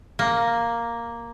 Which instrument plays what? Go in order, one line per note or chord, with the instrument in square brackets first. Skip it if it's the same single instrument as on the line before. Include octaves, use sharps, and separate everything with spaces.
[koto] A#3